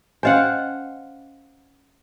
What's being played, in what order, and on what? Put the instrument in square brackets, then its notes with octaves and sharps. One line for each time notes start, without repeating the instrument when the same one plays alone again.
[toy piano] C#4 D#5 G#5 [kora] C5 F5 F#5